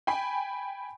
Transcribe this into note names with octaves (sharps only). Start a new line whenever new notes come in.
G5 G#5 B5